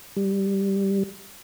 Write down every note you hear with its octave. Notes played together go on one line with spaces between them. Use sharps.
G3